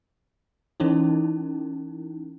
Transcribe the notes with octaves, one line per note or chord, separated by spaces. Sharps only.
E3 C#4 D#4 E4